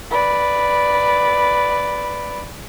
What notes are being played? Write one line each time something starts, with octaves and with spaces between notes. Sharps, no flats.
B4 D5